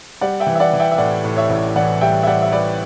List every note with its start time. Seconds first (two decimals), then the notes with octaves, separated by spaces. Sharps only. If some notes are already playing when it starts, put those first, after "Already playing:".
0.21 G3 D5 F#5
0.40 E5 G5
0.47 E3
0.55 E5
0.60 D5 F#5
0.73 E3
0.80 E5 G5
0.92 E5
0.98 A2 D5 F#5
1.24 A2
1.36 C#5 E5
1.49 A1
1.76 E3 D5 F#5
2.01 G3 E5 G5
2.23 E5
2.27 G3 D5 F#5
2.42 E5
2.52 G3 B4 D5